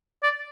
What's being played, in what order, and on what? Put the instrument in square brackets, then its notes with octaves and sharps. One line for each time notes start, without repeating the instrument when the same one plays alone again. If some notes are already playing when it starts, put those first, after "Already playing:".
[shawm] D5